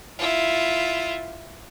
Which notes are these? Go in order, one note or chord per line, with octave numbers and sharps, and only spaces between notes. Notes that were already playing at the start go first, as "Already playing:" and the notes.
E4 F4